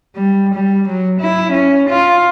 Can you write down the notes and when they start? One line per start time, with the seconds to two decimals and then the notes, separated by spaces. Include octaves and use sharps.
0.16 G3
0.54 G3
0.88 F#3
1.21 E4
1.52 C#4
1.89 F4